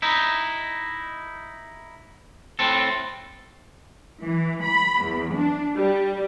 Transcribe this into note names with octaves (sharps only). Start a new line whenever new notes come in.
D#4 E4
A2 C4 A4
E3
B5
E2
D4
G3